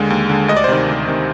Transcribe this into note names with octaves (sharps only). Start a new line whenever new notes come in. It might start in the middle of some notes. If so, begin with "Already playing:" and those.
Already playing: D#2 D3 G#3
D#2
D3 G#3
D2 D#5
D5
C5
C3 D#3 D5
D2
C3 D#3